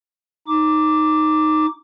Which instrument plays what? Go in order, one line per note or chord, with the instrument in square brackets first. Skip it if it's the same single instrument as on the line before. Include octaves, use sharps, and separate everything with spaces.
[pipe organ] D#4 D6